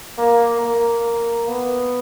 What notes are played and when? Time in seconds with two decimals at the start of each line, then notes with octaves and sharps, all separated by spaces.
0.18 A#3
0.61 A#3
1.48 B3